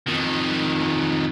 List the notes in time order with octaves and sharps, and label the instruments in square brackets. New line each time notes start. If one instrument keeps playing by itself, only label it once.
[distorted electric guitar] F2 D#3